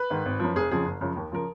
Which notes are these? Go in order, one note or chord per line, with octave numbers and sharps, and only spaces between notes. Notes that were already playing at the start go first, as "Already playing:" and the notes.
Already playing: B4
G#2 D#3
G#1
F#2 F3
F1 G#4
F2 C#3 F3 G#4
F#1
F#2 C#3 F3
D#2
C#3 F3 A#4